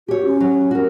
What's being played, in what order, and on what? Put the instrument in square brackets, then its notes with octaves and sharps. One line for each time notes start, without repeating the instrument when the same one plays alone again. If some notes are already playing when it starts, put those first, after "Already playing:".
[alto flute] F#4 [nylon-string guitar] G4 C#5
[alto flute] C#4
[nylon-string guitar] F#3
F#4 A#4